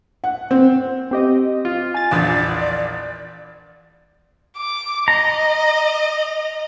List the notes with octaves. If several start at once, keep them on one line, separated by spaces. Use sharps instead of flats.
F#5
C4
C4 G4 D#5
F4
G#5 A6
A#1 E2 D4 D5
D6
D#5 A#5